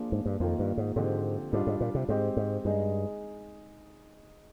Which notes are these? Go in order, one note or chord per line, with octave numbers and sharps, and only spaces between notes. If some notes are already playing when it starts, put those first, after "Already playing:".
Already playing: F3 A#3 D4 F4 G#4
G#2
G2
F2 D#3 A#3 F4
G2
G#2
G#2 D3 F3 C4 G4
G#2 G3 D4 F4
G#2
A#2
C3
G#2 G#3 C4 G4
G#2
G2 G#3 D#4 G#4